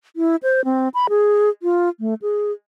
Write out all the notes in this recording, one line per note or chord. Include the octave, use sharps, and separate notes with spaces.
E4
C5
C4
B5
G#4
F4
A3
G#4